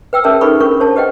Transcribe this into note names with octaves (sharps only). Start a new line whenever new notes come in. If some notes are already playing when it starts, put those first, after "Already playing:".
B4 G5 E6
C#4 G#4 A#4 C#5 E5 A5
D#4 G#4 A4 B4 B5 C#6
C#4 D4 A#4 C#6
C5 C#5 A5
G4 B4 D#5 F#5 G5